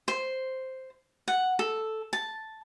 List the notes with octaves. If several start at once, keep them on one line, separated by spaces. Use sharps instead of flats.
C5
F#5
A4
A5